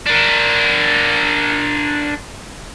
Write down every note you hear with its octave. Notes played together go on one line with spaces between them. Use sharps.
D4 A#4